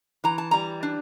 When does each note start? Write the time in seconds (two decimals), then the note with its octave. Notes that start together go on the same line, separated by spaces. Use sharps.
0.24 E3 A#5
0.38 A5
0.51 G3 A#5
0.83 D4